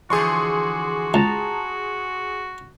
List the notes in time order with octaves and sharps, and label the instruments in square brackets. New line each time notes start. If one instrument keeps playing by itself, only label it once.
[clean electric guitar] D3 E3 F3 [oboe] F#4 [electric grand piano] G#4 C6 C#6
[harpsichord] C#2 [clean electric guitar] A5 A#5